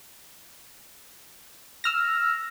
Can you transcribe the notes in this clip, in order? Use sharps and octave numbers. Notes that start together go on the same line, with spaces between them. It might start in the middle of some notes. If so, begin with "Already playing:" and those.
E6 F6 A#6